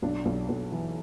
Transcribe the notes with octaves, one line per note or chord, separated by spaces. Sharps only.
B1 D4
B1
B1
E3